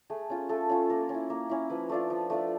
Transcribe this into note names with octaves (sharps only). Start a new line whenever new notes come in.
A3 G#4
C#4 F4
A3 A4
C#4 F4
A#3 A#4
C#4
E4
A#3
C#4 E4
F3 B4
A3 D4 F4
F3
A3 D4 F4